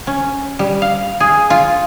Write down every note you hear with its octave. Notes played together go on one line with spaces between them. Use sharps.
C#4
G3
F5
G#4
F4